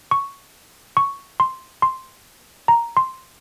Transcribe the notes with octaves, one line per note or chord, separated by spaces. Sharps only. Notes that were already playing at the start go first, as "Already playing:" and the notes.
C#6
C#6
C6
C6
A#5
C6